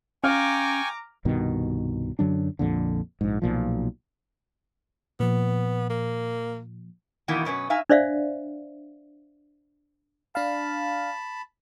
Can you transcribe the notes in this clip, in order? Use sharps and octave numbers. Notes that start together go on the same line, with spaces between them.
C#4 F5 G5 G#5 A#5 C#6 D6 F6
C2 G2 B2 D#3
F#2 D3 F#3 D4
A#1 F2 A#2 D3
A#1 G#2
B1 A#2 F3
A#2 F3 B3
A#3
B2 D#3 E3 A#3 B3
F#2 B2 C#4 B4
D#4 E5 F5 G#5
D4 C5 D5 E5 F5
D4 F5 A5 B5